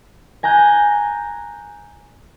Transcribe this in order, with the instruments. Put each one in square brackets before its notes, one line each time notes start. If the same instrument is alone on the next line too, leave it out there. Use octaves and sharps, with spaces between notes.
[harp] G#5 A#5 F#6 G6